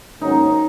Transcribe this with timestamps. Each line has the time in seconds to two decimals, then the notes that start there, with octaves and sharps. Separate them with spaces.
0.21 G#2 D#3 F#3 A#3 C#4 D#4